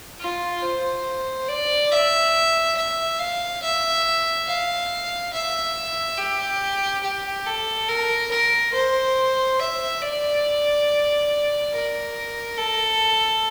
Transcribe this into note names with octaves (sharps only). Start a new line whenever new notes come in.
F4
C5
D5
E5
E5
F5
E5
F5
E5
G4
G4
A4
A#4
A#4
C5
E5
D5
A#4
A4